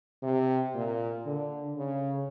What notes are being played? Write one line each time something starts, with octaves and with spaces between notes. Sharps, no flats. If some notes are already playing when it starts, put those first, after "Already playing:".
C3
A#2
D3
C#3